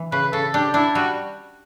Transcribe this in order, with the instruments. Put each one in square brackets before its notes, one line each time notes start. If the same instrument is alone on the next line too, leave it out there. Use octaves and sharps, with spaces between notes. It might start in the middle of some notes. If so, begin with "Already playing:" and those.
Already playing: [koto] E3
[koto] C#3 [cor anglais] B4
[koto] C#3 [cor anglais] A4
[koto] D4 [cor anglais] G4
[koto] D4 [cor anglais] E4
[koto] G3 [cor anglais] F#4